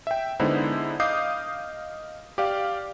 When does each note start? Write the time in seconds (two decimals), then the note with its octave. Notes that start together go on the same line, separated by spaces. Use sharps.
0.07 E5 G5
0.40 D3 G#3 B3 D#4 E4 C5
1.00 D#5 F5 D6 D#6 G6 C7
2.38 G4 D5 F5